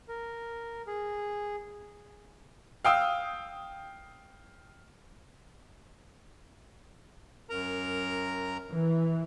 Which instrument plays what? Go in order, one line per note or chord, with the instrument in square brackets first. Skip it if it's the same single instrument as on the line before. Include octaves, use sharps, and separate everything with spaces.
[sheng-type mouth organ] A#4
G#4
[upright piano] F5 G5 D#6 E6
[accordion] F#2 A#4 A#5
[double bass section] E3